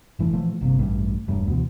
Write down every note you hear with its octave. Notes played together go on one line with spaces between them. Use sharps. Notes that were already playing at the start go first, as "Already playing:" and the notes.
F#1 E3 A3
A#2 E3 F3 A3
G1 C3 A#3
A1 G2 A3
E1 G2 F#3 A3
D2 B2 E3